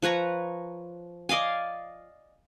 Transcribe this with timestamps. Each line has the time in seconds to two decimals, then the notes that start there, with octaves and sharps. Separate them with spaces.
0.02 F3 B4 C#5 A#5
1.29 D5 D#5 F5 G#5